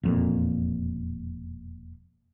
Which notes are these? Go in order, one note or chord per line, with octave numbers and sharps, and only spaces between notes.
E1 F2 A#2